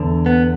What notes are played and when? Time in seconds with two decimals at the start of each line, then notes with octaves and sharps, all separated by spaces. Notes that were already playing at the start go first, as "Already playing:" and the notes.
Already playing: E2 D3
0.26 B3